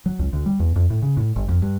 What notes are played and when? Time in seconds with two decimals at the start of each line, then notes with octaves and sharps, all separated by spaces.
0.06 F#3
0.19 C#2
0.33 D2
0.46 G3
0.60 E2
0.76 F2
0.90 A2
1.02 C#3
1.17 A2
1.36 G1
1.49 F2
1.62 G2